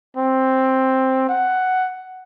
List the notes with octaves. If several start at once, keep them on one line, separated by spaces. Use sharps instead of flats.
C4
F#5